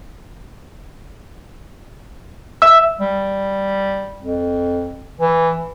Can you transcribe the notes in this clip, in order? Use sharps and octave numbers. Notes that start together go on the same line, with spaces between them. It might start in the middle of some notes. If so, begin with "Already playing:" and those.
E5 E6
G3
F2
E3